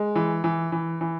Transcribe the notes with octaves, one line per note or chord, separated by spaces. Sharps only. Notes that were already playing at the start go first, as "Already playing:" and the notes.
Already playing: G#3
E3
E3
E3
E3